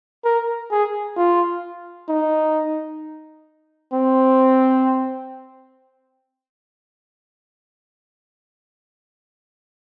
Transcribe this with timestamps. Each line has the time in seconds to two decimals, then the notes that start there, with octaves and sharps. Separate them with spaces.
0.25 A#4
0.71 G#4
1.16 F4
2.09 D#4
3.93 C4